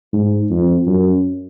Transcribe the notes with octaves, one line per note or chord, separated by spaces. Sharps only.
G#2
F2
F#2